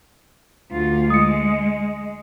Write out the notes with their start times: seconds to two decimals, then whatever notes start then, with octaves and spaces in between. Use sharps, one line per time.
0.72 D2 F4
1.10 G#3 D#6 C#7